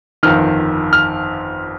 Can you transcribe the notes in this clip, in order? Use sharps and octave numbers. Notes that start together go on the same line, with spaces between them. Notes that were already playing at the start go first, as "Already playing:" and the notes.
G1 F2 D#3 F6
F6